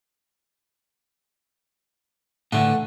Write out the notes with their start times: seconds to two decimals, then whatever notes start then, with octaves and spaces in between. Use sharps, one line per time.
2.52 A2 D3 E3 A3 F#5